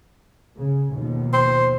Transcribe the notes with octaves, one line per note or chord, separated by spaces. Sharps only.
C#3
D#2 B2 F3
C5